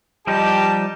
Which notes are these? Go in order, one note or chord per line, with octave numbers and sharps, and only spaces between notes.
F3 G3 D#4 G4 A5